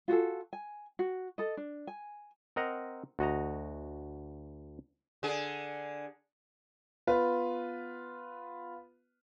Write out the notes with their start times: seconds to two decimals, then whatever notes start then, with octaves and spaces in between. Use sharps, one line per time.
0.08 F4 F#4 G#4 A4
0.53 G#5
0.99 F#4
1.38 A4 D#5
1.57 D4
1.87 G#5
2.56 C4 A#4 D#5 F#5 A#5
3.19 D2 F#4 D#5 A#5
5.23 D3 G#4
7.07 B3 F4 B4